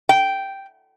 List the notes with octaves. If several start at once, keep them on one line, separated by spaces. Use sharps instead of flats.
G5